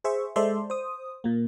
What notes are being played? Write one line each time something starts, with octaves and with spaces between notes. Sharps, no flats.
G#4 C5 E5 C#6
G#3 A4 C5 D5 E5 C6
C5 D#6
A#2 A#3